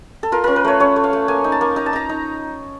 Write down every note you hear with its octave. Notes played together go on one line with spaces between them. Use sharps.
A4
F4 A#4
C#4 A#4
B4
A3 C#5
C#4 C#5
A3
F5
A3
A#3 G#5
D#4
A5
A#3
D#4 A#5
A5
D#4 A#5
D#4